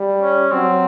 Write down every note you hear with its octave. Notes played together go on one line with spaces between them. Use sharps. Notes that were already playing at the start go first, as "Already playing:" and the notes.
Already playing: G3
C#4
F#3 C4